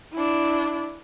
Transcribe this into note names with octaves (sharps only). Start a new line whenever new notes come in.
D4 E4